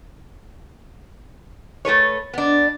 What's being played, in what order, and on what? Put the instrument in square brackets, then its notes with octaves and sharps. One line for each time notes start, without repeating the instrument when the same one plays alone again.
[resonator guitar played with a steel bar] A3 A4 B4 C#5
B3 D4